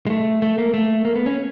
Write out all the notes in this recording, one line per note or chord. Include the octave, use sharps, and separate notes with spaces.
G#3
A3
A3
A#3
A3
A#3
B3
C#4